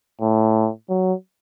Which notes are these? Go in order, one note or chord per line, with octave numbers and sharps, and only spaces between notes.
A2
F#3